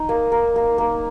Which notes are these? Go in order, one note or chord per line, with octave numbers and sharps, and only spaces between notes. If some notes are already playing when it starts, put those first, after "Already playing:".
Already playing: D#4 D#5
A#3
A#3
A#3
A#3